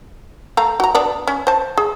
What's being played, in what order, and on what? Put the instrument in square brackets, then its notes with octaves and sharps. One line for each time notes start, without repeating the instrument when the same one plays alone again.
[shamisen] A3 F5 A#5
F#4 A#5
B3 D4 D5
C#4
C5 A5
G#4